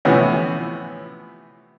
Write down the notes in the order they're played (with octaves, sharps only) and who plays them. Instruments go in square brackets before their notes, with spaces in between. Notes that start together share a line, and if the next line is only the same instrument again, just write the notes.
[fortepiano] A2 C3 E3 F3 B3 C#4